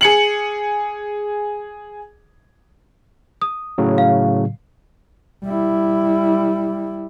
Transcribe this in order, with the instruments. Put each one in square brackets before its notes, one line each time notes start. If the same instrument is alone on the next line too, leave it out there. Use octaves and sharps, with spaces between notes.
[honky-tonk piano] G#4 C#7 F#7
[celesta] D#6
[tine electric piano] A2 C#3 F#3
[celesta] F5
[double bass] G3 E4